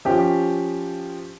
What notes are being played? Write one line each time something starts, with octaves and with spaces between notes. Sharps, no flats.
F3 C#4 G4